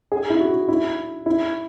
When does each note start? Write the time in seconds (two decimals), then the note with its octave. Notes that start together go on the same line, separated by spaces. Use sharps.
0.12 G#4
0.30 E4
0.40 F#4
0.68 E4
1.26 E4